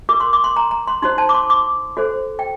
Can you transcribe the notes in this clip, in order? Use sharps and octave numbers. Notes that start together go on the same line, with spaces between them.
F#4 A#4 D6
C6
D6
C6
A#5
A#5
C6
D#4 F#4 C5 C6
A5
D6
C6
D6
F#4 A4 C5
G5